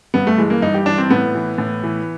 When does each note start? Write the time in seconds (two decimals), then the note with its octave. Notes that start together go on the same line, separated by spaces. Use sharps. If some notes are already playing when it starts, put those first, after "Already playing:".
0.14 G2 B3
0.27 A3
0.38 E3 G#3
0.50 A#3
0.62 G2 D#4
0.74 G4
0.86 E3 D4
0.98 C4
1.10 A2 B3
1.35 E3
1.58 A2
1.83 E3